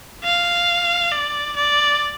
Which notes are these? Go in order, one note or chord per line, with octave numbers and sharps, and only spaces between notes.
F5
D5
D5